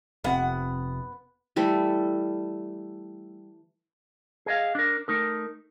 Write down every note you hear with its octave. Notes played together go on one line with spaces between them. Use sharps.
F1 C3 B3 F#5
E3 G3 A3 A4
G#4 D#5 F5
D4 A#4
A3 D#4 A#4